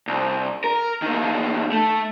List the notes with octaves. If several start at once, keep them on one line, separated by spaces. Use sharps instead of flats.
C2
A#4
E2 D#3
A3